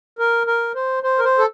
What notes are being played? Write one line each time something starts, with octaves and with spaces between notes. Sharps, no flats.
A#4
A#4
C5
C5
A#4
C5
A4